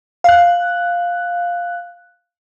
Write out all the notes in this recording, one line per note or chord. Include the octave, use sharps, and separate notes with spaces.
F5 F#6